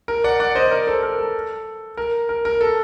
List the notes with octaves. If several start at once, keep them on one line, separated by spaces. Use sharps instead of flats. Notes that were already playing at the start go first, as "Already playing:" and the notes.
A#4
D5 F#5
D5 F#5
C5 D#5
A#4 D5
A4 C5
A#4
A4
A#4
A#4
A#4
A4